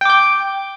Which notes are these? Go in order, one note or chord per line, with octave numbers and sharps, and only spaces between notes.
G5 D6 G6